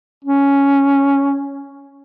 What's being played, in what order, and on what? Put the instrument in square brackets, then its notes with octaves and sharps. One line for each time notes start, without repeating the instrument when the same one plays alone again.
[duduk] C#4